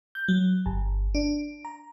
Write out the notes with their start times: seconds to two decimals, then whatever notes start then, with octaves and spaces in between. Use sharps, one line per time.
0.15 G6
0.28 F#3
0.66 G1
1.15 D4
1.65 A#5